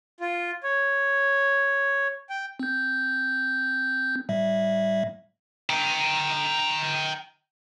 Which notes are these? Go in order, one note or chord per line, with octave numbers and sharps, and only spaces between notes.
F4
C#5
G5
C4 G6
A2 G3 E5
G5 A#5